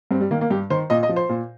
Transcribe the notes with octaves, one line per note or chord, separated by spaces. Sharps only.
G2 C4
G3
D#3 A#3
A#3
G2 G4
D#3 C5
A#2 D#5
D#5
F3
C5
A#2